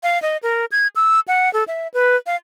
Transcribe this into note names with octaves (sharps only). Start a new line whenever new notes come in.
F5
D#5
A#4
G#6
E6
F#5
A4
E5
B4
F5